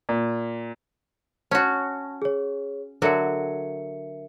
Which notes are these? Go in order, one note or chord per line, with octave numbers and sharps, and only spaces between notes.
A#2
C#4 F#4 A5
G#4 C#5
D3 F#3 F#4 A#4 E5 C#7